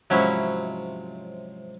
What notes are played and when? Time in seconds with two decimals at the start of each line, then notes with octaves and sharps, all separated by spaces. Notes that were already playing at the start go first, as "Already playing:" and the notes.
0.10 G#2 C3 F3 F#3 C#4 E4